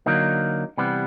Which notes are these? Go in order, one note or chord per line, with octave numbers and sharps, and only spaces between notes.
D3 F#3 A#3 D#4
C3 E3 G3 B3